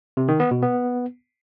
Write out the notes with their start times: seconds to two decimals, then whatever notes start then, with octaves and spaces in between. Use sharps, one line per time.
0.17 C3
0.28 D#3
0.40 B3
0.51 B2
0.62 B3